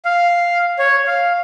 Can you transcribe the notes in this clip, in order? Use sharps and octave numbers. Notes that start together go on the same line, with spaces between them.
F5
C#5
F5